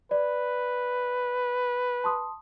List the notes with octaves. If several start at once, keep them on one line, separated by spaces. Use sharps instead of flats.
B4 D5
A5 C6 D#6